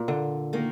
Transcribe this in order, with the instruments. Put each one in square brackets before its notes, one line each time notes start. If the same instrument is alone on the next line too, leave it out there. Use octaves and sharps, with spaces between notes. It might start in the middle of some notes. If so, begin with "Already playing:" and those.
Already playing: [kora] A#2
D3
[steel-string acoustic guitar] D#3 A#3